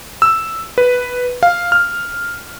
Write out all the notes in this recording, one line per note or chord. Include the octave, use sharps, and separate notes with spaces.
E6
B4
F5
F6